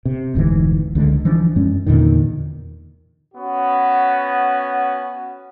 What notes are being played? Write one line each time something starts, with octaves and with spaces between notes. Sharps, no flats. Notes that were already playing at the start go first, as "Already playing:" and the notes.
C3
F1 D2 G#2 E3
C#2 D3 G3 G#3
E3 F3 D4
F#2 G#3 C#4
E2 A#2 D3 D#3
B3 C#4 F#4